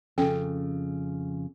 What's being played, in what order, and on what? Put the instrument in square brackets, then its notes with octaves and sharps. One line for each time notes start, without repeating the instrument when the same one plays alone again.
[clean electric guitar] F2 C#3 [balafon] C#4 A4 G5